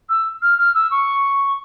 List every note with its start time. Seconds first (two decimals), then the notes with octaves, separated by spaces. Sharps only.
0.09 E6
0.42 F6
0.58 F6
0.74 E6
0.91 C#6